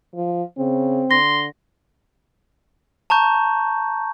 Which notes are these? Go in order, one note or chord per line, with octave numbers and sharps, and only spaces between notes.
F3
C#3 C4
D3 C6 A#6
A5 A#5 C#6 G6